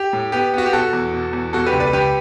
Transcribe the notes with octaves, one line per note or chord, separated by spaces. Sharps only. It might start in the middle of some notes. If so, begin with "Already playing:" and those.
Already playing: G4
A2
B3 G4
B3 F#4
G4
B2 F#4 A4
E2
B2
E2
B2 F#4 A4
G4 B4
C#2
B4 D5
C#2 G4 B4